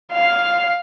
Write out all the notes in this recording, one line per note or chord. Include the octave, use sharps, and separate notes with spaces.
F5